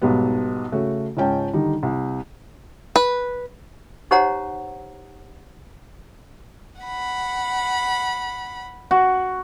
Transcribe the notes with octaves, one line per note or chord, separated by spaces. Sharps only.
B1 G#2 G3 B3
C#3 A3 F#4
C#2 G#2 C#4 G5 A5
D3 D#3 G3 D#4
C2
B4
D#4 G4 C5 C#5 F#5 A#5
F#5 B5
F#4